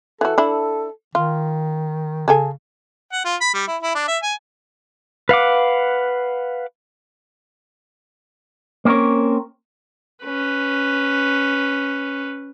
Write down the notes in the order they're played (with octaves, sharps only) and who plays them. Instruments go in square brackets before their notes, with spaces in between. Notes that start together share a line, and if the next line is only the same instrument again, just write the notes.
[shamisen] E3 F#4 [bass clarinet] A4
[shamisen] D4 E4
[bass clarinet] D#3 [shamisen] F4
[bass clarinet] C#3 [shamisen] G#4 A4 G#5
[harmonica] F#5
F4
B5
G3
E4
E4
D4
E5
G#5
[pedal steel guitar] B4 F5 F#5 D6
[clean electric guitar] A#3 C4 C#4 A#4 C#5
[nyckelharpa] C#4 B4